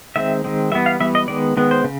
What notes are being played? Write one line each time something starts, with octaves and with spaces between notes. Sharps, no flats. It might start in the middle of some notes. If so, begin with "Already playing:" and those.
D#3 G#3 C4 E5
D#3 G#3 C4
E3 G3 B3 E5
F5
E3 G3 B3 E5
D#5
D#3 G#3 B3 D5
D#3 G#3 B3
C5
C#3